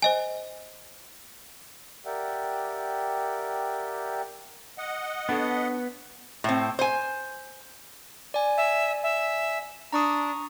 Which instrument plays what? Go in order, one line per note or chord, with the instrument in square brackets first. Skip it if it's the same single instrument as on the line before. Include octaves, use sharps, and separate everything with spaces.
[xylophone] C5 D#5 G#5
[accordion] G4 A#4 D5 E5 F#5 G5
D#5 F#5
[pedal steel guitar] B3 [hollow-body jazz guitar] D4 A4 C#5
[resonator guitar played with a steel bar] A2 C4
C5 G#5
[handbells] D5 G#5
[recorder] E5
E5
[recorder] D4 [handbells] A#5 C#6 D#6